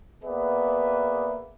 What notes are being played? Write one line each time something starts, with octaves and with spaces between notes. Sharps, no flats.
A#3 B3 G#4 B4 D5 E5